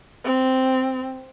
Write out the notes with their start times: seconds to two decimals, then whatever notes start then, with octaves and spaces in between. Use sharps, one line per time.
0.25 C4